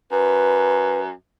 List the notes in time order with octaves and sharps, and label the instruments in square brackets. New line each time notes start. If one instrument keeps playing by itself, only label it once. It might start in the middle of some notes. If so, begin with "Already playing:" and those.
[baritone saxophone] F#2 [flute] B4